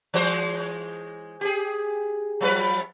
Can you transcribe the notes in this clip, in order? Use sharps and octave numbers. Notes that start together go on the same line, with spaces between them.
E3 G#3 C5
G4 G#4
F3 F#3 B4